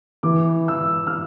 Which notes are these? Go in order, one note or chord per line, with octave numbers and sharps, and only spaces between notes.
E3 D6
E3 E6
F6